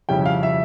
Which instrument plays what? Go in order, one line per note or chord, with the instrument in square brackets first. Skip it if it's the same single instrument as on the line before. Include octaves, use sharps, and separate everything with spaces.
[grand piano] F2 C#3 G3 C#4 E4 G5
F5
E5